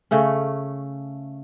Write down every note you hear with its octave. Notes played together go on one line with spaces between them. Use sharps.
C#3 A3 C#4